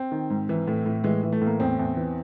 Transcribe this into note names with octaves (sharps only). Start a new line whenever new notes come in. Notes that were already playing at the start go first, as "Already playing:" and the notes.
Already playing: C4
D#3
G#2
E3
A2
A2
E3 G#3
E3
A3
A2 A#3
E2 C4
E2
E3